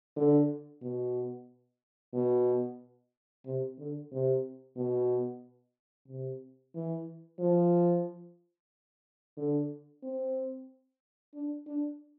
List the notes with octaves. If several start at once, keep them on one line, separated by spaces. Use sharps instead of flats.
D3
B2
B2
C3
D3
C3
B2
C3
E3
F3
D3
C4
D4
D4